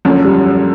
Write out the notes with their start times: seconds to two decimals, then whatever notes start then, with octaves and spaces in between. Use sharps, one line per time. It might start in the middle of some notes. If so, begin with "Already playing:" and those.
0.05 F#1 F#2 D3 F3 C#4
0.25 G3